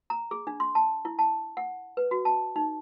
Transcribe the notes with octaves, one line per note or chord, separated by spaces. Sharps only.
A#5
G#4
D4
C6
A5
E4
A5
F#5
B4
F#4
A5
D#4